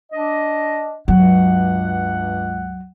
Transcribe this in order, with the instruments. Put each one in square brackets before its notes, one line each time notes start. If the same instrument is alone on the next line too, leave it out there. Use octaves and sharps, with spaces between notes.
[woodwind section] D4 D#5
[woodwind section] C#2 G2 F#5 [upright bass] F#3